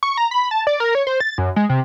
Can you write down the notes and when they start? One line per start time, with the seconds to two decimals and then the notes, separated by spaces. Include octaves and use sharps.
0.03 C#6
0.17 A#5
0.31 B5
0.51 A5
0.67 D5
0.80 A#4
0.95 C#5
1.07 C5
1.20 A6
1.38 F#2
1.56 G#3
1.69 C3